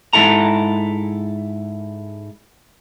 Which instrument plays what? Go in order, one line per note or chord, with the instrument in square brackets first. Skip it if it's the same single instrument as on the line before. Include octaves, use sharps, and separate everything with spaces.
[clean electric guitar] G#2 C3 E4 A4 A#5